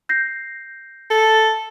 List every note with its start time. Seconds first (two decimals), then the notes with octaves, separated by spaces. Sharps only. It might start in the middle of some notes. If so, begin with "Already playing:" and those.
0.09 G6 A#6 C7
1.10 A4